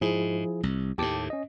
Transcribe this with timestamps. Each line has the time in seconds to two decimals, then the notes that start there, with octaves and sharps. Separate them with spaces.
0.01 G#2 F3 E4 G#4
0.63 C2
0.98 D#2 A2 G4 A5 D6
1.30 C#4 D#5